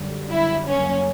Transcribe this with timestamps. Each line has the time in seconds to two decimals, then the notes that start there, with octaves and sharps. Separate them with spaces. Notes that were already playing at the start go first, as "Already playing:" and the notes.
Already playing: F#2 D3 G3
0.30 E4
0.68 F#2 C#3 F#3 A#3 C#4